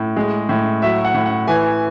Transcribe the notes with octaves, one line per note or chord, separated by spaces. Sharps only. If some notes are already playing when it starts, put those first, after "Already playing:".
Already playing: A2
G#3
A2
F#3 E5
F#5
A2
F#5
E3 G#5